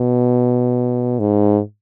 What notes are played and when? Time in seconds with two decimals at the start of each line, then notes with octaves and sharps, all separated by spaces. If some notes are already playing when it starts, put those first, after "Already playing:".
Already playing: B2
1.19 G#2